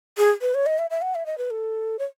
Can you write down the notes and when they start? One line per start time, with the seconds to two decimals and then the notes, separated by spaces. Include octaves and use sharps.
0.18 G#4
0.41 B4
0.54 C#5
0.66 D#5
0.79 E5
0.90 E5
1.02 F#5
1.15 E5
1.26 D#5
1.38 B4
1.50 A4
1.99 C#5